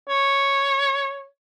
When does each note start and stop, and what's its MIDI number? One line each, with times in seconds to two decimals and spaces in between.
0.09 1.26 73